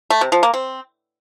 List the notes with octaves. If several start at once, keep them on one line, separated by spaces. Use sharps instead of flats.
A3
C3
F3
A#3
C4